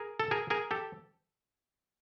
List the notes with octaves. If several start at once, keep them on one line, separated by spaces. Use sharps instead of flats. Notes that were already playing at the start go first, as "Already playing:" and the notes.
Already playing: G#4 A#4
A4
G#4 A#4
G#4 A#4
G4 A4